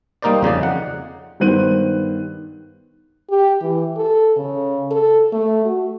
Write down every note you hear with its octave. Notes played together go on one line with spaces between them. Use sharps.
G3 A#3 D#4 A#4 C5 D5
F2 C#3 D#4 D5
F#5
G2 D#3 B3 C5 F#6 D#7
G4
E3
A4
C#3
A4
A3
F#4